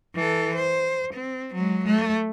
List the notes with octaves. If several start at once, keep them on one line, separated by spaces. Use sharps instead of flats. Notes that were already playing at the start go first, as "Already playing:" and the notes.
E3 A4
C5
C4
F#3 G#3
A3